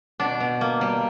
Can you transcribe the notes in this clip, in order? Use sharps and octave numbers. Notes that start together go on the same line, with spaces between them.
B2 D4
B2
A#3
G3